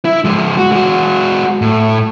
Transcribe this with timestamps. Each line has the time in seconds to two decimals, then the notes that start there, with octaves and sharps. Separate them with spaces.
0.05 E4
0.25 F3 G#3
0.58 F#4
0.72 G#3 F#4
1.61 A2